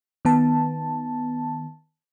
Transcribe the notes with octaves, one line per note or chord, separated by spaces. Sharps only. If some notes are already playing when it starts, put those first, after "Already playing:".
D#3 B3 A5